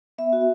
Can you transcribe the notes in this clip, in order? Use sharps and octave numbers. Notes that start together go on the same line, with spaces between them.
B3 E5
F#4